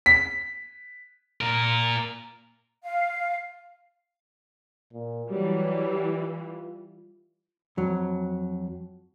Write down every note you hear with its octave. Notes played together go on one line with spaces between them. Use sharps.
B6
A#2 A#4
F5
A#2
E3 F#3 G3
F4
F2 F#3